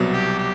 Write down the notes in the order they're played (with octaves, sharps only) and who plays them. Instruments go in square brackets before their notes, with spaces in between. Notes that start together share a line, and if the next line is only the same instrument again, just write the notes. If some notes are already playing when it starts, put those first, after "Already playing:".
Already playing: [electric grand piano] C2 B2 F#3 B3
[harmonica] G4
G4